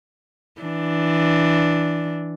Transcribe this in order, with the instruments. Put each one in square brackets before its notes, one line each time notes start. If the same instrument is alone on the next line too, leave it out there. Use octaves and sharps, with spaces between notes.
[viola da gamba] E3 D4